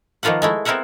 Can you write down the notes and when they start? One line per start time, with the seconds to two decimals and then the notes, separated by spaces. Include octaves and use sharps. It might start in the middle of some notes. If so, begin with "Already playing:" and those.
0.23 D#3 F3 A#3 F4 B4 F#5
0.42 G#3 A3 E4
0.65 B3 C4 E4 A#4 E5 F#5